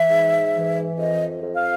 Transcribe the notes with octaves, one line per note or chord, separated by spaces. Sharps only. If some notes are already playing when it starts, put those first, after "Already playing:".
Already playing: E3 E5
G#2
E3
F2 D#5
F2
F5